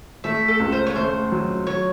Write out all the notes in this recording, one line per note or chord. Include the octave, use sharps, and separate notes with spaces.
A3 E5
A4
C#2
C5
C#5
A3 C5
F#3
F#3 C#5